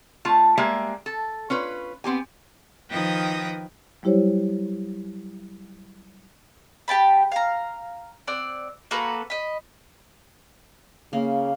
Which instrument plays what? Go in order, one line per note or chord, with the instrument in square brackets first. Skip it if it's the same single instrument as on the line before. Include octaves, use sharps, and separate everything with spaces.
[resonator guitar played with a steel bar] A3 F4 A5
G3 G#3 A#3 G4 E5
A4
C#4 F4 B4
B3 C4 G4 G#5
[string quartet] D#3 F3 B4 G5 D#6 A#6
[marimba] F#3 G3 E4 G4 C5 C#5
[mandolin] G4 G5 A5 B5
F5 A#5
C4 D5 F#5
A#3 F#4 A4 B4
D#5 B5
[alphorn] C#3 [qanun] A#3